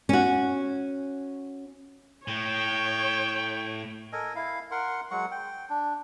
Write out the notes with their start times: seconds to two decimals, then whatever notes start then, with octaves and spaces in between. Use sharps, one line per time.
0.09 C#4 F#4
2.28 A2 C#5 G5
4.13 A4 A#4 D#5 G#5
4.36 E4 F5
4.71 A#4 F#5 C6
5.11 F#3 G#3 F#5 C#6
5.31 G5
5.70 D4